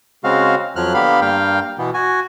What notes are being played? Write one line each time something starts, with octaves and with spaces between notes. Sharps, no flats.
C#3 G#3 C4 F#4 F5
F2 F3 F#3 F6 F#6
D3 A#3 B3 G4 F5 B5
G2 A#3 F5 G5
B2 E3 B3
F#4 G#5